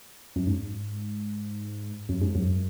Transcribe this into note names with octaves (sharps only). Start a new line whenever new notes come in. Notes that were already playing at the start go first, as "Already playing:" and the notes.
F#2
G#2
F#2
G#2
F#2